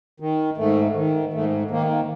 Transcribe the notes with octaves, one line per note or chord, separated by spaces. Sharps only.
D#3
G#2 A3
D#3
G#2 A3
D#3 A#3